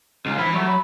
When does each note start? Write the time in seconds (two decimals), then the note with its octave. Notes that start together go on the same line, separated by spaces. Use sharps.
0.26 C#2 D#4 F4 F5
0.39 E3 F3 E4 B5
0.54 F#3 A3
0.68 B5